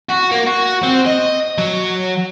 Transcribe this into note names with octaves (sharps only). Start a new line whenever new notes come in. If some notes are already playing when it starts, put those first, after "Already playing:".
F#4
A#3
F#4
C4
D#5
F#3